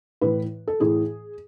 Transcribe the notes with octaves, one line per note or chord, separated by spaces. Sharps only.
A2 E3 B4
A4
A2 E3 G#4